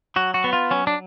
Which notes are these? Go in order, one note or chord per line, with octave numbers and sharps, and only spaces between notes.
F#3 F#4
F#4
B3
F4
F#3 C#4
D4